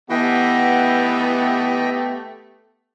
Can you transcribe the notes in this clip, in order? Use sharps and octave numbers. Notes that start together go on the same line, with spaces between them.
E3 A3 B3 G4 D#5 E5 G5